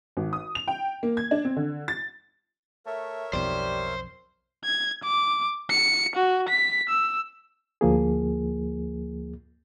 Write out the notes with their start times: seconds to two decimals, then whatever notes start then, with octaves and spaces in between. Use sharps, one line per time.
0.17 G#1
0.33 D#6
0.55 F7
0.68 G5
1.03 A#3
1.17 G#6
1.31 D4
1.45 C4
1.56 D3
1.88 A6
2.86 A3 A#4 C#5 E5
3.33 B1 F2 G3 C5
4.65 G#6
5.04 D6
5.70 C#7
6.16 F#4
6.49 B6
6.89 E6
7.81 D2 F3 A#3 G#4